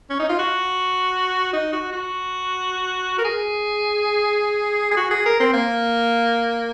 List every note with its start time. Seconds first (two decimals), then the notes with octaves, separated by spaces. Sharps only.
0.10 C#4
0.19 D#4
0.29 F4
0.39 F#4
1.53 D#4
1.73 F#4
1.92 F#4
3.18 A#4
3.25 G#4
4.91 G#4
4.97 F#4
5.10 G#4
5.25 A#4
5.40 C4
5.53 A#3